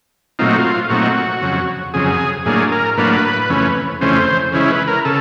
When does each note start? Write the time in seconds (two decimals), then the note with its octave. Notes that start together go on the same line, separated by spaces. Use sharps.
0.39 A#2 F#3 A3 C4 D#4 F4
0.49 F#4
0.57 F4
0.90 A#2 F#3 A3 C4 D#4 F#4
1.42 F2 C#3 F#3
1.94 F2 C#3 F#3 G#4
2.45 A2 F#3 A#3 D4 G#4
2.72 A#4
2.97 A2 F#3 A#3 D4 B4
3.49 F2 C#3 E3 A3 C#4
4.01 F2 C#3 E3 A3 C#4 C5
4.52 C#3 E3 G#3 C#4 E4
4.71 B4
4.88 A#4
5.05 C#3 A4